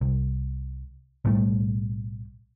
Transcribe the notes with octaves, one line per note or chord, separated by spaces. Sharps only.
C2
B1 A2 G3 A3